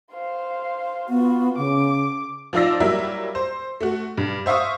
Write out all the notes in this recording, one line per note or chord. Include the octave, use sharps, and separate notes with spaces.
C5 F5
B3 F4 F#4
C#3 D6
F3 D#4 F4 D5 E6 A#6
F#3 G3 A#3 E4 A#4 E5
C5
A3 F#4
G2
C5 E5 F5 C#6 D#6